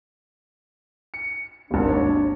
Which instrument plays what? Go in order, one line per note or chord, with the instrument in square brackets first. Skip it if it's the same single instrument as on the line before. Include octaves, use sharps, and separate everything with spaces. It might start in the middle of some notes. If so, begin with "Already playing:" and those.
[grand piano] C#7
[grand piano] G#1 D#2 [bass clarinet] D4
[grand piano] C#5